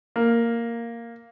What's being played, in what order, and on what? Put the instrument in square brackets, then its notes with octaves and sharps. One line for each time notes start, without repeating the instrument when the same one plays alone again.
[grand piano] A#3